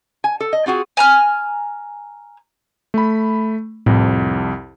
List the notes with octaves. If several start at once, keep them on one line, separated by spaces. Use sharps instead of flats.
G#5
A4
D#5
C4 F4 F#4 G#4
G#5 A#5 F6
A3 B5
C2 F2 A2